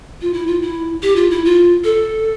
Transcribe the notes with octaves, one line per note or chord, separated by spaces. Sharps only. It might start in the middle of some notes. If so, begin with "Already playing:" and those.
F4
E4
F4
E4
G4
F4
E4
F4
A4